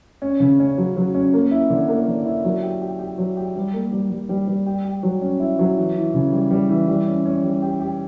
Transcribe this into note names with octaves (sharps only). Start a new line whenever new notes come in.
C#4
C#3
C#4
F#3
F#3
C#4
A#3
E4
D3
A#3
D3
E4
F#3
G4
G4
G4
F#3
G4
G3
A#3
G3
G3
G3
G3
G4
G4
F#3
C#4
E4
F#3
E3
E3
C#3
G3
G3
E3
G3
C#4
C#4
G3
G4
G4